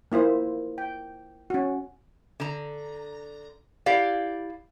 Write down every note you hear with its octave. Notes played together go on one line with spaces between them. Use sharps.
A#3 E4 F4 C5
G5
C#4 F#4
D3 A#5
E4 G4 D5 F5